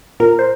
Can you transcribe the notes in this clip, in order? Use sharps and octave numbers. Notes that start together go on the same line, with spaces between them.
A#2 A#4
C5